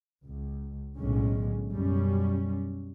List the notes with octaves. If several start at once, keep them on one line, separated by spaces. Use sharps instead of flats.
C#2
B1 A2 D3 G#3 C#4
F#2 B2 G3 C#4